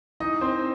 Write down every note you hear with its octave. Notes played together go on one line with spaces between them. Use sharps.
E3 D#4 D#5
C4 C5